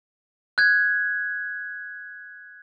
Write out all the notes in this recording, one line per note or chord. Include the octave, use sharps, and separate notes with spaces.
F#6 G#6